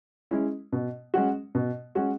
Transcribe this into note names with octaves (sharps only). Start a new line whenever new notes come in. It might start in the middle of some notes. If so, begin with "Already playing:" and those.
G#3 C#4 E4
B2
G#3 C#4 F#4
B2
G#3 C#4 F#4